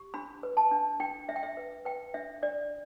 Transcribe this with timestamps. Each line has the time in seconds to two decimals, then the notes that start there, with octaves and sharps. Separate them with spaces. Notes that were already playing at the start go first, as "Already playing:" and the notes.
Already playing: G4
0.14 D4 B5
0.43 B4
0.57 A5
0.72 D4
1.00 D4 G5
1.28 D4 E5
1.36 G5
1.43 E5
1.57 B4
1.85 B4 G5
2.14 D4 E5
2.42 D4 D5